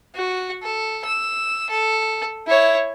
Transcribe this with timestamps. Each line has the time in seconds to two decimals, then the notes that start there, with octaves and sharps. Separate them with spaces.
0.15 F#4
0.63 A4
1.05 E6
1.69 A4
2.47 E4 C#5